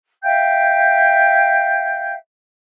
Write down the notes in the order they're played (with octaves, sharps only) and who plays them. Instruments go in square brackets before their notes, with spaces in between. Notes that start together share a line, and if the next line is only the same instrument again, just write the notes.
[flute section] E5 F5 G5 G6